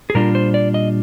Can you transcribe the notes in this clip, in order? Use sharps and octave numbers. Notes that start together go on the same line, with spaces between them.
G#4
A#2 G3 D4 F4 A#4
C5
D5
D#5